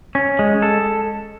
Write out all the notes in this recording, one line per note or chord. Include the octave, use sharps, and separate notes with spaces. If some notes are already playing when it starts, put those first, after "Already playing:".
C#4
G#3
A4